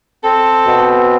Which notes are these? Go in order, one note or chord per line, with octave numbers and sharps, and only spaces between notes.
C4 A4
B2